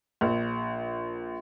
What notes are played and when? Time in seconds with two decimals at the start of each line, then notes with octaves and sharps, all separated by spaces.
0.21 A#1